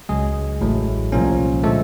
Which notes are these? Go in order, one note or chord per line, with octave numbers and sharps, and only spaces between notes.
C#2 C#3 F#3 G#3 G#4
A1 A2 F#3 A3
C2 A#2 F3 A#3 C#4
D3 F3 G#3 A3 A4